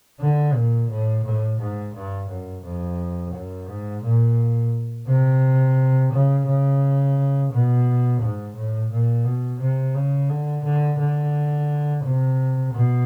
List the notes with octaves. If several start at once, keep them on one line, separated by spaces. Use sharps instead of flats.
D3
A#2
A2
A2
G#2
G2
F#2
F2
F#2
G#2
A#2
C3
C#3
C#3
B2
G#2
A2
A#2
B2
C3
C#3
D3
D3
D3
C3
B2